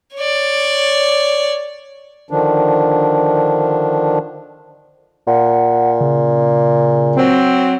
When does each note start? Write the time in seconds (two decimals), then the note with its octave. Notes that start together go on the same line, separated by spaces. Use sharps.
0.15 C#5 D5
2.31 D3 D#3 F3 D4
5.27 A#2 F#5
6.00 C#3
7.16 F#3 C4